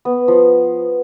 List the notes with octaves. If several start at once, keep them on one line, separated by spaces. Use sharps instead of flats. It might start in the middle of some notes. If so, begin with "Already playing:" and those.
B3
F3